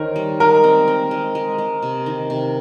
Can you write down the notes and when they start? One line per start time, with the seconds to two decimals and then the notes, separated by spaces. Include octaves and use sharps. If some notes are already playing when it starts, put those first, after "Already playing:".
Already playing: D#3 A#4 C5 C#5
0.16 G3
0.40 G#3 A#4
0.64 C4
0.88 C4
1.11 G#3
1.35 G#3
1.58 G#3
1.82 C3
2.06 D#3
2.30 C3